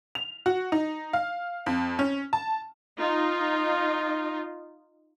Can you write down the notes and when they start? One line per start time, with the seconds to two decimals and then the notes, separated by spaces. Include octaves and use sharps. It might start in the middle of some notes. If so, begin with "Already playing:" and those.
0.15 F7
0.46 F#4
0.72 D#4
1.13 F5
1.66 F2
1.99 C#4
2.33 A5
2.99 D#4 F4